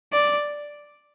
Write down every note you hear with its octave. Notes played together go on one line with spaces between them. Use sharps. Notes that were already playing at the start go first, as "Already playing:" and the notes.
D5